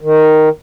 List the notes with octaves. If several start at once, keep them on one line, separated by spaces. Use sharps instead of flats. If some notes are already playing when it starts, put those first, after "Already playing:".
D#3